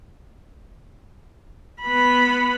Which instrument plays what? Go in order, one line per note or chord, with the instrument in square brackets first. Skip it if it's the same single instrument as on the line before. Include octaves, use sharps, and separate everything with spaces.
[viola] B3 B5